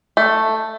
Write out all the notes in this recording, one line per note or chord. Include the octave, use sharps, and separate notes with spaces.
A3